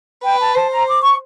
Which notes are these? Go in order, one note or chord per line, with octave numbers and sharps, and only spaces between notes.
B4 G5
A5
C5 A5
A#5
D6
C#6